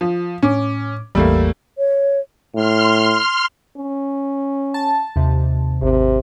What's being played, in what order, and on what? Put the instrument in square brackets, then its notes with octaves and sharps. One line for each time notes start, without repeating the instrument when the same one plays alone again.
[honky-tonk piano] F3
[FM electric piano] A2 D6 [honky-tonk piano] C#4
[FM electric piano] A1 E2 E6 [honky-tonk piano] G3 A3 A#3
[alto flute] C#5
[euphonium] A2 [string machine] C6 F6
[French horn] C#4
[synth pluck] A5
D#2 C3
[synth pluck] G#1 [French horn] C3